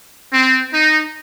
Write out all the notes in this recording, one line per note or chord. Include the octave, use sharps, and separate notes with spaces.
C4
D#4